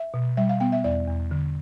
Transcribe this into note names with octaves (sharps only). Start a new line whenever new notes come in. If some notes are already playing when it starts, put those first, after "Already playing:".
Already playing: E5
B2
G3 E5
F5
B3 G5
E5
E2 D5
E2
D3